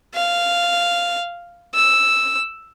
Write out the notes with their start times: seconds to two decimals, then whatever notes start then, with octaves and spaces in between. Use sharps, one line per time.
0.14 F5
1.74 E6